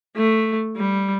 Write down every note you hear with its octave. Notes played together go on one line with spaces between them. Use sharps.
A3
G3